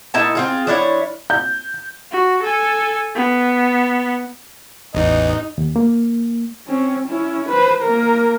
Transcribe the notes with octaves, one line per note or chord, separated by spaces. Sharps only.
A#2 D#4 E4 A5
C4 F4 G#4
F3 D4 E4 C#5
G6
F#4
A4 G#5
B3
A1 E2 D#4
D#2
A#3
C4 C#4
C#4 E4
B4 C5
A#3 A#4